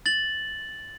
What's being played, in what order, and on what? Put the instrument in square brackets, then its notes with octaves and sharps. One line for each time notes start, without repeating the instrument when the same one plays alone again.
[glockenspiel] A6 F#7